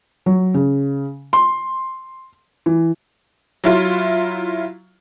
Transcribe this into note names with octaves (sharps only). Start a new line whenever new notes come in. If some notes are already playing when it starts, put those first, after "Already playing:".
F#3
C#3
C6
E3
F#3 E4 F4